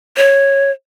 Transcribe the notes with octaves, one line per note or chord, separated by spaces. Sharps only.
C#5